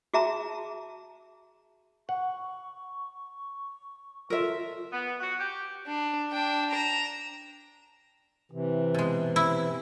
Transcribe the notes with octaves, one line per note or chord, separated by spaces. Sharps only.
F#4 G#4 E5 A5 A#5
F#5 C#6
F4 A4 A#4 E5
B3
F#4
G4
D4
D4 G5
A#5 E7
C3 E3
B2 G#3
E4